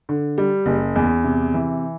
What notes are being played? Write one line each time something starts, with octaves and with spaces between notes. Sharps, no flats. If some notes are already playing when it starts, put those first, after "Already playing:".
D3
G3
F#1
E2
C3
E3